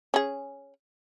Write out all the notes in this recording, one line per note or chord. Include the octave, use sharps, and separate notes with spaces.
C#4 G#4